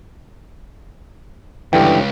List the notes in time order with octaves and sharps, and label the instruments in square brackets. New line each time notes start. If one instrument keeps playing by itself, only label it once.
[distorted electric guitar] C#2 [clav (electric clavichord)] G2 D3 E3 [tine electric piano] G5